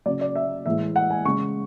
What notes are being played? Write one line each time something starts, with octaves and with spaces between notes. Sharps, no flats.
C#3 F#3 D5
D5
E5
A2 E3 G#3 E5
F#5
G#5
C#3 G#3 C#6